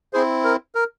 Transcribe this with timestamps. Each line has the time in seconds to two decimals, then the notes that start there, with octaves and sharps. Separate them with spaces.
0.13 C4 E4 G#4 C5
0.44 A#4
0.75 A#4